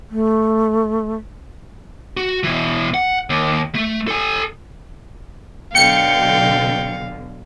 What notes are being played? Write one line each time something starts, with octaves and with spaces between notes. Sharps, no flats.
A3
F#4
B2 E3
F#5
D#2
A3
A4 G#5
B2 D3 F#3 F5 G5 C#7